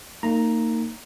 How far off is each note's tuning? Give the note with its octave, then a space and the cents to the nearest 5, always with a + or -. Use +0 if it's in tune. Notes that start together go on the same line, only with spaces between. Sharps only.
A#3 -30 D#4 +0 A#5 +0